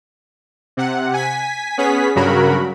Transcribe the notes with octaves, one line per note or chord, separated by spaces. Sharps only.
C3 F#5
G#5 B6
B3 C#4 G#4 B6
G2 C#3 F#3 F#4 A#4 B5